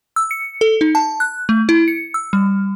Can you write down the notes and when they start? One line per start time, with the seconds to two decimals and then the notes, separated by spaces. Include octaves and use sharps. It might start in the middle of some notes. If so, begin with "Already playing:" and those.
0.16 E6
0.31 C#7
0.61 A4
0.81 D#4
0.95 A5
1.20 F#6
1.49 A3
1.69 E4
1.88 C#7
2.14 E6
2.33 G3